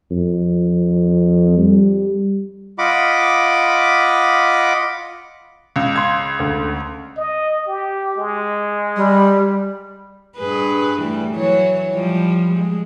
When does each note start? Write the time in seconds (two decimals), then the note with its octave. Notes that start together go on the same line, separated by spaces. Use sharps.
0.11 F2
1.58 G3
2.78 F4 D#5 F#5 B5 D6
5.76 C#2
5.96 C6 G#6
6.40 D2
7.17 D#5
7.67 G4
8.16 G#3
8.97 G3
10.38 G2 G#4 B4
11.00 E3 G3 A3
11.36 E3 F#3 C#5
11.93 F3 G3
12.54 G#3